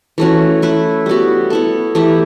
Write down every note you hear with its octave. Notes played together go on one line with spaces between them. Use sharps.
E3 A3 C#4 F#4
A3 E4 B4
G3 B3 F#4
B3 E4 A4
E3 A3 E4 G4